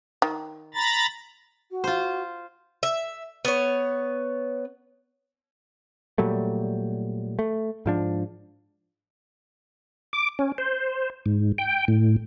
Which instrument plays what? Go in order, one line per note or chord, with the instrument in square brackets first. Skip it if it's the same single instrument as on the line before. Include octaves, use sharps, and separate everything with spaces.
[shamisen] D#3
[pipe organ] A#5 B5 A6
[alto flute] F#4
[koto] F4 C5
[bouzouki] E5
B3 C#5
[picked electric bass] A#2 F#3 G3 A3
A3
G#2 F3 D4
[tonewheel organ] D6
C#4
C5
G#2
G5
A2